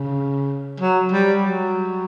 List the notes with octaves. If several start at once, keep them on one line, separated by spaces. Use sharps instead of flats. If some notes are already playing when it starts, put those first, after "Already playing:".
Already playing: C#3
F#3
G3
F#3